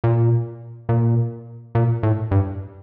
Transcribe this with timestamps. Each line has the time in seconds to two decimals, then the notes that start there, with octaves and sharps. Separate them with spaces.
0.04 A#2
0.89 A#2
1.75 A#2
2.03 A2
2.31 G2